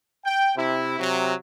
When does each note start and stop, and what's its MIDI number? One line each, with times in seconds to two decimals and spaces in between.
0.25 0.52 79
0.56 0.98 48
0.56 0.98 64
0.99 1.33 48
0.99 1.33 54